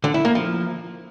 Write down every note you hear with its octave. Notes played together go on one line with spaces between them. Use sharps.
D3
E4
A#3
F3